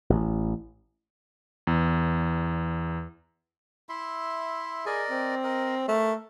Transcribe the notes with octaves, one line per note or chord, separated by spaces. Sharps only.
A1
E2
E4 E5 C6
G#4 A#4 D5 D#5
C4
A#4 D#5
A3 A#4